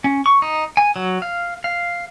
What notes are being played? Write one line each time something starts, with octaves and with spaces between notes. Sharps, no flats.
C#4
C#6
D#4
G#5
F#3
F5
F5